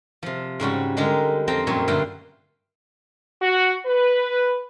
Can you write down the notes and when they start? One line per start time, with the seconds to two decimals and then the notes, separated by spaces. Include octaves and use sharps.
0.23 C3 F3
0.60 G#2 C#3 G3 F#4
0.97 D3 G3 G#3 D#4 G4 A#4
1.48 F2 C4 D#5 G5 A5 A#5
1.67 F#2 A#2 F3 G3 C#5 C6
1.88 G2 D3 A3 F5 G5 C6
3.42 F#4
3.86 B4